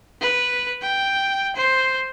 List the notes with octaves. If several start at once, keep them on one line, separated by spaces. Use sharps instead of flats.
B4
G5
C5